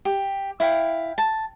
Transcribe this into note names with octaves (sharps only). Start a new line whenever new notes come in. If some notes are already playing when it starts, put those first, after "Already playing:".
G4
E4 F5 G5
A5